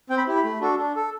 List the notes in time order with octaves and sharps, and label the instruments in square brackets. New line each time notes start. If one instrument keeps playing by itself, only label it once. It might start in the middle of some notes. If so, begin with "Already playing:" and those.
[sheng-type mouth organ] C4 G5
B5
E4 G4
B5
A3
D4 F#4 A4
D4
A4